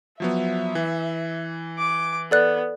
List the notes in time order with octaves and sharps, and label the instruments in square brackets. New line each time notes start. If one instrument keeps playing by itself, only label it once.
[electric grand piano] F3 F#3 B3 [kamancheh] E5
[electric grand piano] E3
[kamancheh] D6
[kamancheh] B3 [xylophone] A4 D5 F#6